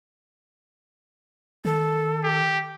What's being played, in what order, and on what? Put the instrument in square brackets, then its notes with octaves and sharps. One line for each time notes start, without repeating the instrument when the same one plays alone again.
[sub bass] D#3 [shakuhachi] A4
[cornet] G4